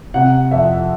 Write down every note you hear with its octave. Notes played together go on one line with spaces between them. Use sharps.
C3 F#5
F2 E5